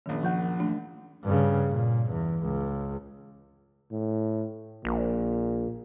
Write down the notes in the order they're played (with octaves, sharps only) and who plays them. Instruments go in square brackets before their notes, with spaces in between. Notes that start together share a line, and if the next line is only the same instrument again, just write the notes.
[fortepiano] A#1 F#2 [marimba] D#3
[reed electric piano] F3 F#5 [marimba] C#6 G6
[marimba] E3 A3 D4
[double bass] G2 C#3
A#2
E2
C#2
[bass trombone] A2
[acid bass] A#1 [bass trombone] A#2